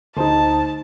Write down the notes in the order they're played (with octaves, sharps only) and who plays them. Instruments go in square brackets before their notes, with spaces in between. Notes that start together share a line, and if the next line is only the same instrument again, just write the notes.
[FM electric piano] D2 [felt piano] D#4 C5 [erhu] A5